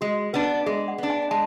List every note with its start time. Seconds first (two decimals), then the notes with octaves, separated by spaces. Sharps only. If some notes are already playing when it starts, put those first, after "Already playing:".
0.01 G#3 F#4
0.33 B3 D4 B4
0.66 G#3 G#4
0.88 F#5
0.98 B3 D4
1.10 G#5
1.22 G#5
1.31 G#3 A5